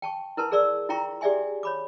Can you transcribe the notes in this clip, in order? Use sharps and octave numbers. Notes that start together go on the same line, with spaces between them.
G5 A5 C#6
E4 A#4 B4 A5 C6
G#4 A#4 D5 C6 E6
E4 F4 G5 A#5 C6 C#6
G4 G#4 D5 E5 G#5 C6
C#5 B5 D6